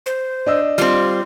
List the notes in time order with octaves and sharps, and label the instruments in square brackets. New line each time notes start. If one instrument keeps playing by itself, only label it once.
[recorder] C5
[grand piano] D4 D#5 E6
[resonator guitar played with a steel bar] G3 C4 [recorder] F4